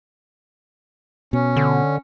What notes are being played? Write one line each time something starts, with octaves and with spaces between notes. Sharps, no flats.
B2 C#4
D3